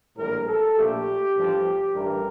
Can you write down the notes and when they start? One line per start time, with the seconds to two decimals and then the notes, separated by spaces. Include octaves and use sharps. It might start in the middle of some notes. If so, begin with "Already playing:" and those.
0.16 A#1 A2 E3 G3 A#4
0.47 A4
0.75 A#1 A#2 A3 G4
1.35 A1 G2 F3
1.94 A1 G2 E3 G3 A#4